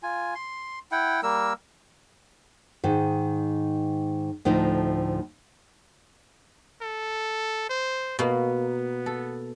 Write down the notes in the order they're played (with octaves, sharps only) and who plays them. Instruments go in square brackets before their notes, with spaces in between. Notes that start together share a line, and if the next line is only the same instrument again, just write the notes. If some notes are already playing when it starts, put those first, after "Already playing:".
[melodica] F4 G#5
C6
E4 F#5 G5
G3 A#3 A#4 E6
[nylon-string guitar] G#2 D#3
D2 A2 F3 D#4
[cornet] A4
C5
[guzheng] B2 A#3 [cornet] B3
[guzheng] A4